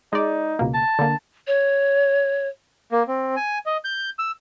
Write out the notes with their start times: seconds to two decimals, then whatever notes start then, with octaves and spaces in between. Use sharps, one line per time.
0.13 G#3 D#4 D5
0.59 C#2 B2 A#3
0.74 A5
0.99 D3 A#3
1.47 C#5
2.92 A#3
3.08 C4
3.36 G#5
3.66 D#5
3.84 G6
4.19 E6